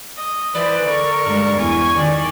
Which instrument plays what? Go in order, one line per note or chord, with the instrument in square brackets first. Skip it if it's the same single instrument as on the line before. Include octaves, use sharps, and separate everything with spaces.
[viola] D#5
[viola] E3 C5 [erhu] B4 [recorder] D5
[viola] D3 C#6 [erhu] A#4
[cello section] G2 G#3 [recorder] D5
[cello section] E2 [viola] G#5 [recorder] C#6
[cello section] D#3 [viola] C#4 [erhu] D5